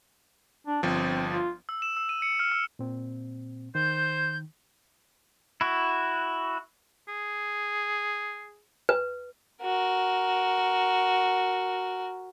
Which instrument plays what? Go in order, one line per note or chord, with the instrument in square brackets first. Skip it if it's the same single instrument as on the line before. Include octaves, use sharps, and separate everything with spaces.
[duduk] D4
[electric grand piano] G1 F3 [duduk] C4
[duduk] F4
[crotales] E6
E7
E6
D#7
C#7
F6
E6
[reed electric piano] A#2 C4
[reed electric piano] D#3 [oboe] C5 [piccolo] G6
[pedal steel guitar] E4 F#4
[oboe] G#4
[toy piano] B4
[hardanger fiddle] F#4 A#4